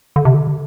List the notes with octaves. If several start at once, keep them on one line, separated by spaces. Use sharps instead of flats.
D3
C3
D3